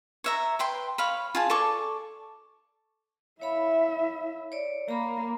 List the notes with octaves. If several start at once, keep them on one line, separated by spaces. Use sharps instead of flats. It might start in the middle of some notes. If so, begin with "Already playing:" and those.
C#5 E5 A#5
B4 G5 C6
C#5 F5 B5
F4 G#4 A5
A4 D5 C#6 D6
E4 C#5 E5 F5 B5
C#5 D5
A#3 A#5 B5